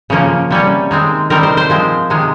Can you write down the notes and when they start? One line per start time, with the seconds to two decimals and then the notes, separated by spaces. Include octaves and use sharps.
0.10 C#3 F3 A#3 C#4
0.51 C3 G3 C#4
0.91 D#3 G#3 C4
1.30 C3 D#3 G3 C4 A#4
1.43 C5
1.57 C5
1.70 F3 G#3 C4
2.10 C3 D#3 G#3